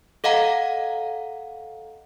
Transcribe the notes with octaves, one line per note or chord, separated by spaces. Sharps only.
A4 D#5 F5 F#5 A#5